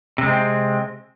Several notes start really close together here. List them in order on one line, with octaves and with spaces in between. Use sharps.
C3 G#3 C4